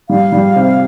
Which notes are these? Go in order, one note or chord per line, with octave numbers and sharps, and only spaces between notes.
G3 F5
G3
C3